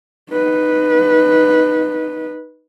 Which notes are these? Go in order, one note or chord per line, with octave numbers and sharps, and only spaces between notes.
D#4 B4